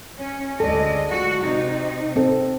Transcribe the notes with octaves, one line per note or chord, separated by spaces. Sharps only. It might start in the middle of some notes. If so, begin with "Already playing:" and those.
C#4
D2 G#3 A4 D5 D#5
F#4
C3 D#4
C4 A4